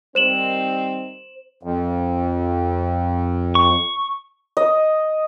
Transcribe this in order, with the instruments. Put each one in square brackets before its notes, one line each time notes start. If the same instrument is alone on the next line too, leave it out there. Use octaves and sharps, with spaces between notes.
[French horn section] D#3 G3 C4 [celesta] C5 E7 F#7
[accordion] F2
[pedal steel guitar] C#6
[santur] D#5